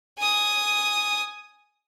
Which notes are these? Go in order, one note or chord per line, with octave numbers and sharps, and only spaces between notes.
G#5 D#6